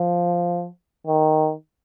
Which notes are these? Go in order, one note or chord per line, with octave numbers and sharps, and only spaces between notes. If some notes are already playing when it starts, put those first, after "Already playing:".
Already playing: F3
D#3